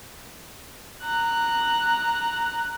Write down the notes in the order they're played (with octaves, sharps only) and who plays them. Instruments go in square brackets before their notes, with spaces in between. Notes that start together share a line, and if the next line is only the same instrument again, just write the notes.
[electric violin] A#5 F#6